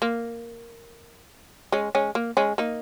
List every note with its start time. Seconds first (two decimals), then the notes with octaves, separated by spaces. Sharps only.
0.02 A#3
1.72 G#3 C#4
1.95 G#3 C#4
2.15 A#3
2.37 G#3 C#4
2.58 A#3 D#4